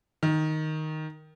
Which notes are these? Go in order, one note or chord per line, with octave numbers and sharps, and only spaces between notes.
D#3